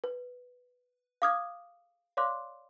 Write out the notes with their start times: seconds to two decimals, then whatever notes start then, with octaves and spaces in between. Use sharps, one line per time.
0.04 B4
1.22 F5 D6 D#6 F6 G#6
2.17 C#5 D5 F5 C6 D6 F#6